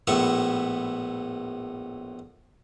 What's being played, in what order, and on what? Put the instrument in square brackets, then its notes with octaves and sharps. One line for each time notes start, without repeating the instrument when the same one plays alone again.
[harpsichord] A#1 A2 B3 E5 C#6